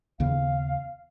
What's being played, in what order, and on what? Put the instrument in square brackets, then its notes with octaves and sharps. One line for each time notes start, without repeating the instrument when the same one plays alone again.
[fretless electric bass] D#2 C#3 B3 [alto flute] F5